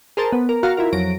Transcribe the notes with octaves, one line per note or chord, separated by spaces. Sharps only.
G#4 A#4 C5 A5
B3
A#4
F#4 A#4 F5 F#5 A#5
E4 F4 A#4
F2 F#3 A#6 D7